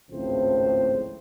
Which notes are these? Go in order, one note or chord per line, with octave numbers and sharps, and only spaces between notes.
G#1 C#2 A2 F3 C4 C5